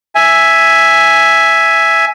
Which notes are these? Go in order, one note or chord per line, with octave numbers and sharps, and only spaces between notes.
E5 G#5